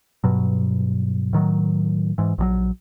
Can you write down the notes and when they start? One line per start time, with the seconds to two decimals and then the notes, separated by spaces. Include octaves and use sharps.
0.24 G2 B2 F#3
1.33 A2 D#3 F#3
2.18 G#2 E3
2.38 A#1 D#3 F#3